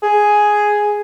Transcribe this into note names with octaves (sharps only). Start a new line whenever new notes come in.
G#4